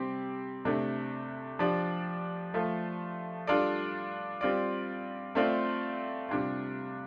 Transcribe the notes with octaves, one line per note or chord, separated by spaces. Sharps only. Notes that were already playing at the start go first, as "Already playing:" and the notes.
Already playing: C3 G3 C4 G4
C3 A3 D4
F3 D4 G4 D5
F3 A3 F4
G3 D4 F4 A4 D5
G3 C4 F4 D5
A3 C4 F4 D5
C3 G3 D4 F4